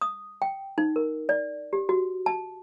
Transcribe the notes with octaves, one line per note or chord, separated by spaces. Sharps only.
D#6
G5
D#4
A#4
D5
G4
F#4
A5